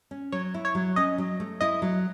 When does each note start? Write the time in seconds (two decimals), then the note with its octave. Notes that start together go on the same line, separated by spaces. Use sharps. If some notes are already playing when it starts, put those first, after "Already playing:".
0.11 C#4
0.32 F#3 C#5
0.54 E4
0.65 C#5
0.75 F#3
0.96 C#4 D#5
1.18 F#3
1.40 A3
1.61 E4 D#5
1.82 F#3